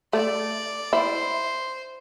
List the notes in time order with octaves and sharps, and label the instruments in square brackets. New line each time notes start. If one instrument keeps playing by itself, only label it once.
[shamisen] A3 [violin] D5
[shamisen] E4 [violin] C5